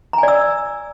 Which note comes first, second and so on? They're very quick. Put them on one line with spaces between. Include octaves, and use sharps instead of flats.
A#5 G#5 D5 E6